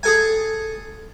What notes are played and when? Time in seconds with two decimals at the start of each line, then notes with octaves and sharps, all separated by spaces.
0.03 G#4 A4 G#5